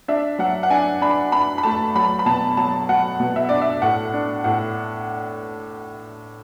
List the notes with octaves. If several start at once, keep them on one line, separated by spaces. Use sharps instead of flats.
D4 E5
F#3 F#5
F#5
D4 G#5
D4 B5
D4 B5
B5
A3 A5
F#3 B5
B5
B2 A5
F#3 A5
F#3 F#5
B2
E5
D4 D5
E5
A2 F#5
D4
A2 F#5